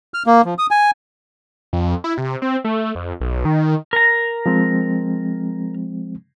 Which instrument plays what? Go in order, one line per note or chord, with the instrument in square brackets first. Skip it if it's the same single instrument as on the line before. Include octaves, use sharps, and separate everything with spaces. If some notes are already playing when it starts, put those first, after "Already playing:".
[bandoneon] F6
A#3
F3
D#6
G#5
[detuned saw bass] F2
E4
C3
C4
A3
F2
B1
D#3
[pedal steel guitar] A#4 A#5
[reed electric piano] F3 G#3 C4